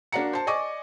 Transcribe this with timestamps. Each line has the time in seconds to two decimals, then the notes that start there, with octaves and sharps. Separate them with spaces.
0.12 A#3 D4 F#4 F#5 A#5 C#7
0.33 C5 A5
0.47 D5 D#5 G#5 C#6 D6